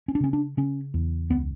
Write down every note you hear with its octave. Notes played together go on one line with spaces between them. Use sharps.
C#4
D4
C#3 C#4
D4
C#3 C#4
E2
C#2 B3